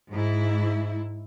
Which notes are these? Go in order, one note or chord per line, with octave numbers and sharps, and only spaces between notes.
G#2 E4